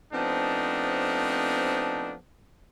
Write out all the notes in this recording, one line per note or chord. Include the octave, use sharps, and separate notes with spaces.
F3 A3 B3 C4 D4 D#4